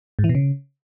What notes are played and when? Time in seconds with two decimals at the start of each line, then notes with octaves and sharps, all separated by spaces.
0.19 G#2
0.24 E3
0.29 B2
0.35 C#3